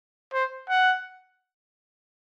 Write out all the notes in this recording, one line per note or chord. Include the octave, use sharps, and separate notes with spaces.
C5
F#5